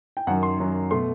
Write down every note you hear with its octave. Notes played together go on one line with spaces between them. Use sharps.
G5
F#2 D#3 F#3 F#5
C6
F#2 D#3 F#3
B2 A3 C6